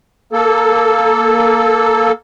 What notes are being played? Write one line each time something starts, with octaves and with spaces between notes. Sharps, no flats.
A#3 A4